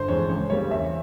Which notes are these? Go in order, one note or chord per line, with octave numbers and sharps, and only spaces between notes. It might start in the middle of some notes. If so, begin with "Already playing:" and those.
Already playing: G1 C5
F2 E3 G#3 C#5
C#2 C#5
C#3 G3 A#3 C#5
E2 E5